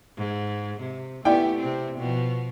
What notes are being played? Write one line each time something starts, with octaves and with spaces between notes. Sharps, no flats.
G#2
C3
A3 B3 E4 G4 D5 G5
C3 C4
B2 F3